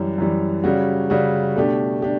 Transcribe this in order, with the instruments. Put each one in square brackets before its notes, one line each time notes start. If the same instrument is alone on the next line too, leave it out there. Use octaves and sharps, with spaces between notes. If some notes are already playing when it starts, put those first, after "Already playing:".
Already playing: [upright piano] F#2 E3 G3
F#2 E3 G3
C#3 G3 C#4 F#4
C#3 G3 C#4 F#4
B2 A3 D4 G4
D4 G4